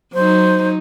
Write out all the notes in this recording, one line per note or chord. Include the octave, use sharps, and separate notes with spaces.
F#3 D#4 C5